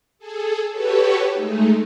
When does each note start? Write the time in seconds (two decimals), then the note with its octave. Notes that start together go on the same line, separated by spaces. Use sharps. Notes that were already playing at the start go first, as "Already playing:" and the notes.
0.19 G#4 A4
0.71 F#4 G4 A4 B4 C#5
1.33 G#3 A3 D#4